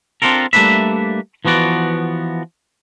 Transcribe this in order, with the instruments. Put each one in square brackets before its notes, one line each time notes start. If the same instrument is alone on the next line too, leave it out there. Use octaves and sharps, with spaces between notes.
[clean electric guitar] C4 D4 F4 A4 A#4
G3 A3 A#3 D4 B4 E5
E3 F3 B3 F#4 D5